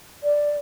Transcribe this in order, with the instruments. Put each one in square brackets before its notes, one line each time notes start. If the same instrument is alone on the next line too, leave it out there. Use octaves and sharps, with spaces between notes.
[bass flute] D5